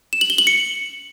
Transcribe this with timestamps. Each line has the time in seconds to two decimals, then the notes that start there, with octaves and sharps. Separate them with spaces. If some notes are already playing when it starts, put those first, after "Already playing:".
0.13 E7
0.21 F#7
0.30 G7
0.38 F#7
0.47 C#7